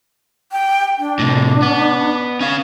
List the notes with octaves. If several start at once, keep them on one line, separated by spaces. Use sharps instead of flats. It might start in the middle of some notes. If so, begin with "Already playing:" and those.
G5
D4
A2 C3
B3
C#4 F5